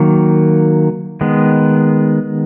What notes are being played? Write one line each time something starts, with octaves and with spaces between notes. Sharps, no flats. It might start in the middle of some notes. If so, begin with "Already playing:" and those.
Already playing: D#3 F#3 A#3
D#3 G#3 B3